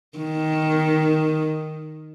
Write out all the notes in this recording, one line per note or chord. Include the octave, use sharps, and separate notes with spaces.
D#3